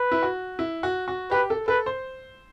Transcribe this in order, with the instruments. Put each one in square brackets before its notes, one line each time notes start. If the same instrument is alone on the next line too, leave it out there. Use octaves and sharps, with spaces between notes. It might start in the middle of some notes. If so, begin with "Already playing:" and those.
Already playing: [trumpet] B4
[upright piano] E4
F#4
E4
F#4
F#4
[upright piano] G4 [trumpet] B4
[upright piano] A4
[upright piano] A4 [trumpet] B4
[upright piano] C5